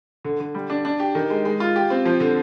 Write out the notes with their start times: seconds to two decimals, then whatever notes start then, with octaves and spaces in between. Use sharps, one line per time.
0.25 D3
0.40 D3
0.54 G3
0.70 D4
0.85 D4
1.00 G4
1.15 D#3
1.30 G#3
1.45 G#3
1.60 F4
1.76 G4
1.90 C4
2.05 F3
2.20 D3